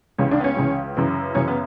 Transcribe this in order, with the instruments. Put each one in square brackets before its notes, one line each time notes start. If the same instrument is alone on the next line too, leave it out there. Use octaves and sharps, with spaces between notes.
[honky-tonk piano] C#2 C#3 E3 C#4
D4
B3
C#4
C#2 C#3 E3
F#2 C#3 E3
F#2 C#3 E3 C#4
B3